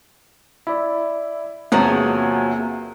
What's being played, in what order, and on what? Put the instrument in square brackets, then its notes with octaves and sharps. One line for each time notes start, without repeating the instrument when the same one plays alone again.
[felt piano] E4 [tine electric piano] D5 E5
[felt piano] E2 C3 [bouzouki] F3 F#3 G#4 [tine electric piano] A#3